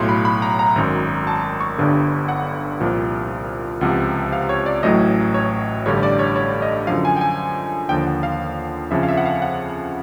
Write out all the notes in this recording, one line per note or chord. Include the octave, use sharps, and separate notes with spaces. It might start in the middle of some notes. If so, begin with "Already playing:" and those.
Already playing: B1 A2 F#3 C6
B5
B5
A#5
A#5
G#1 F#2 D#3
A5
C#6
G1 G2 D3
F#5
C2 A#2 F3
C#2 C3 F3 F#5
F5
C#5
D5
A1 A2 F#3 D#5
C#5
A1 G2 D3 G3 C#5
D5
C#5
C#5
D#5
F#2 D3 F3 F5
G#5
G5
G#5
D#2 D3 F3 G5
F#5
F5
F2 C#3 F3 E5
F5
E5
F#5
F5
F#5